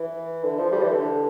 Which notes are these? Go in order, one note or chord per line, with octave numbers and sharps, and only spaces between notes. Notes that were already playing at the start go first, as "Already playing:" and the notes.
Already playing: E3
D3
F3
G3
E3
D3